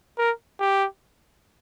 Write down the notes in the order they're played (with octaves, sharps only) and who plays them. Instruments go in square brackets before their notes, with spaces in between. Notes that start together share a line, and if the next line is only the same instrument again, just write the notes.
[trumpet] A#4
G4